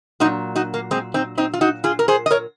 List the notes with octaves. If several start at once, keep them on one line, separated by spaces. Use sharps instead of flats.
A#2 F#3 D#4 F#4
D#4 F#4
A#3
G#3 C4
C4 D#4
C4 D#4
F4
D#4 F#4
F4 G#4
A#4
G#4 C5
D#5
A#4 C#5